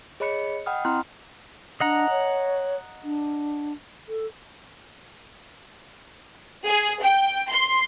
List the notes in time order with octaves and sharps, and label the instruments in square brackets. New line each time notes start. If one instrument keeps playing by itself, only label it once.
[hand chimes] G#4 C#5 D#5 B5 F#6 C#7
D#5 F#5 G5 B5 D#6 F6
C4 E4 A#5 C6 F6 F#6
[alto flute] D4 [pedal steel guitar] D#5 F#5 A#5
[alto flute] C#5
D4
A4
[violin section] G#4
G5
C6